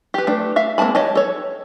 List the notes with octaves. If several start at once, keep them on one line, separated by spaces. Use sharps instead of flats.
G4 B4
A3 D4
E5 F5
G#3 A#3 C4 A5 B5
G4 C#5 D#5 A5
A4 C#5